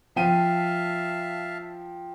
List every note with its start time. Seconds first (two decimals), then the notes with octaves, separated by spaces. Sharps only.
0.16 F3 E5 F5 G5 A5 D#7